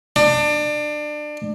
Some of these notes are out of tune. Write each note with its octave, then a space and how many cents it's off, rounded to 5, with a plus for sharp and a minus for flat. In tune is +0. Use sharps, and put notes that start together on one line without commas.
D4 +25